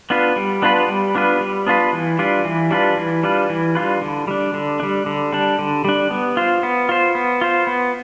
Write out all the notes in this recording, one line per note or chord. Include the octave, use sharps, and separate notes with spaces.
B3 D4 F4 B4
G3
B3 D4 F4 B4
G3
B3 D4 F4 B4
G3
B3 D4 F4 B4
E3
G3 D4 F4 B4
E3
G3 D4 F4 B4
E3
G3 D4 F4 B4
E3
G3 D4 F4 B4
D3
G3 D4
D3
G3 D4
D3
G3 D4
D3
G3 D4
B3
F4 C5
B3
F4 C5
B3
F4 C5
B3